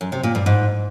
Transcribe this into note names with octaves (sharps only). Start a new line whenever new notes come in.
F#2
C3
A#2
G2
G#2